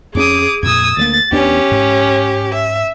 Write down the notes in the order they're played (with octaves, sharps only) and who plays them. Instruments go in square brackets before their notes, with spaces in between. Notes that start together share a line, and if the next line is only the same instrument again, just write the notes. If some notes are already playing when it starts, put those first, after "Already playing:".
[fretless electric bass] F2 C4 C#4 [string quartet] G#4 D6 D#6
[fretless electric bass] F2 A#2 [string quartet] D#6 E6 G#6
[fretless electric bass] D2 G3 A#3 [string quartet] A6
[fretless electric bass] E2 B3 D4 [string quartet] C#4 G4
[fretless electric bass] G#2
[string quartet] E5